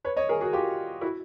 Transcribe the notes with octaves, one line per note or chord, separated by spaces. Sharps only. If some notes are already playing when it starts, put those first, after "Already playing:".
B4 C#5
C#5 D#5
G#4 A#4
F#4 G#4
F4 G4
E4 F#4